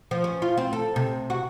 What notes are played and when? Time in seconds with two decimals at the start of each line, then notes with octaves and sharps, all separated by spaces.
0.11 F3
0.24 C#4
0.42 F4
0.58 C4
0.73 A4
0.96 C3
1.30 F#4